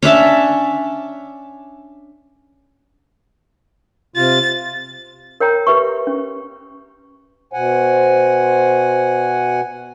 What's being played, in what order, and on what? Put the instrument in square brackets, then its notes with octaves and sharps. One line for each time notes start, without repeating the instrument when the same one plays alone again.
[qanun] C#4 D4 E5 A5
[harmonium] C3 F4 [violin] A6
[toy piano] A#4 C#5 G5 A#5
G4 B4 E5 C#6
C#4
[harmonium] B2 F#5 G#5 [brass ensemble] C5